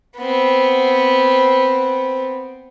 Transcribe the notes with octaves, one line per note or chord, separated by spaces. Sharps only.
B3 C4